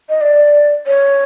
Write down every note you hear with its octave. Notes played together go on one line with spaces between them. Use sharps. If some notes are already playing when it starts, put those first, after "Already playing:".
D#5
D5
C#5